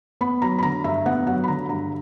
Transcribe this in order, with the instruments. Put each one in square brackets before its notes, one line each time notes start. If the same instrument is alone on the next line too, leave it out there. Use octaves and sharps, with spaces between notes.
[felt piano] B3 B5
F#3 A#5
B5
D3 A#5
G2 E5
B3 F#5
F#3 F#5
B5
D3 A#5
G2 A#5